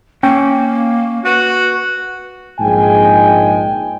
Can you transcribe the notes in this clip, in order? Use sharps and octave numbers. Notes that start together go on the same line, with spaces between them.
A#3 C#4 G5
F#4 B4
A#1 G#2 G#3 G5 G#5